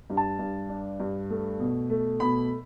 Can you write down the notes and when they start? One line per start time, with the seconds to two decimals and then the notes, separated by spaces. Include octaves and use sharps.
0.10 G2
0.17 A5
0.39 G2
0.69 D4
1.00 G2
1.30 A3
1.59 B2
1.90 A3
2.20 B2 B5